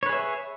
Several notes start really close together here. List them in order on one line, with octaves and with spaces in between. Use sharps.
C#5 B4 G#4 E5